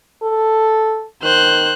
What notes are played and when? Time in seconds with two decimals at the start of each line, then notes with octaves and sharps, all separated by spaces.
0.23 A4
1.23 D#3 C5 F#6